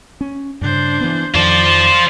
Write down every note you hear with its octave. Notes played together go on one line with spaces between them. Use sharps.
C#4
G2 C#3 D4 C5
E3 B3
F2 D#3 F4 C5 D5